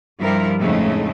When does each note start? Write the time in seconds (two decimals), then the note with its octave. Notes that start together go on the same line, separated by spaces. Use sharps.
0.19 G2 F3 G3 E4 A#4
0.60 F2 A2 C#3 G#3 A3 D#4